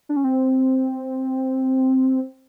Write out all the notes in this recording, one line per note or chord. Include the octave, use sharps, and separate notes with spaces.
D4
C#4
C4